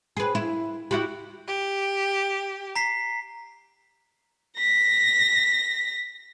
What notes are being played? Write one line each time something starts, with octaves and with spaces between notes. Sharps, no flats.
G#4 B4
E4
E4 F#4 G4
G4
A#5 B6 C7
A#6 B6